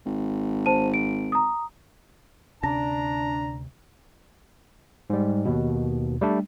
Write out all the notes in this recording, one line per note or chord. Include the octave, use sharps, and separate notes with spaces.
G#1
C5 A5 D#7
D7
A#5 D#6
D2 C3 C#4 D4 A5 A#5 A#6
G#2 G3
D#2 B2
G3 A3 D4